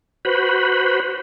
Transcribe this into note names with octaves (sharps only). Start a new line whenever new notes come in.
F#4 B4 C5 B5